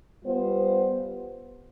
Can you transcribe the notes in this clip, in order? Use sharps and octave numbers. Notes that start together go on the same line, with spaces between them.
G3 B3 F4 C5